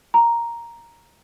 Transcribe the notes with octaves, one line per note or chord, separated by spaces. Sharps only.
A#5